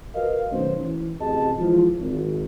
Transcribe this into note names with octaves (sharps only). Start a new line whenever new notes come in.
F#4 A#4 B4 D#5 F5
B1 B2 D#3 A3 C#4 C5
E3
A1 C3 F#4 G#4 D#5 A5
E3 F3 G#3 F4
G#1